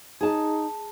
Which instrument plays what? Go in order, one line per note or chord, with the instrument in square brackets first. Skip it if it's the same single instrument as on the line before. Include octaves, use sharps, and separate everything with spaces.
[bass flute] D#4 [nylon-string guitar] G#4 A5